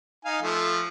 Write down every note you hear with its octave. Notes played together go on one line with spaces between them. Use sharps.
D#4 F5 G#5
F3 A3